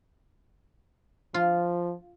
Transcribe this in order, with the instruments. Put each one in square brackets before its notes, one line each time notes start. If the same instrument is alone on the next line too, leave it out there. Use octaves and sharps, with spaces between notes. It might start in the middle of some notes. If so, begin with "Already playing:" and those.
[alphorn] F3 [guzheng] F4